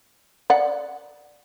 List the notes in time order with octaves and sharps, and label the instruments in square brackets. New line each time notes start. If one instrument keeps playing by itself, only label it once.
[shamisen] D5 F#5